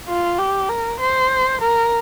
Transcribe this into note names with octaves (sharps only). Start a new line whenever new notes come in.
F4
G4
A#4
C5
A#4